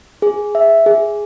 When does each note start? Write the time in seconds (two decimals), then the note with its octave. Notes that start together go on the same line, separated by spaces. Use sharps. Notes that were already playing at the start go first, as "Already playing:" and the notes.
0.22 G#4
0.55 E5
0.86 G#4